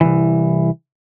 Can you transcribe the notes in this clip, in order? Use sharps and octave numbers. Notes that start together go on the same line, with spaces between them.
C2 F2 E3